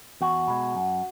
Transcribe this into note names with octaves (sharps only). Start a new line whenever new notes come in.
E2 F#4
B2 G#3
F#2